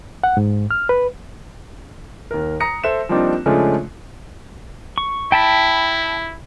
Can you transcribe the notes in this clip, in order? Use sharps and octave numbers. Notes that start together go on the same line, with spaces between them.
F#5
G#2
F6
B4
D#2 A#4
A#5 D#6 A#6 C#7
A4 C5 E5 E7
F3 G3 A#3 C4 D4 D#4
C#3 F3 G#3 A3 C#4 D4
C#6
E4 G5 A5 B5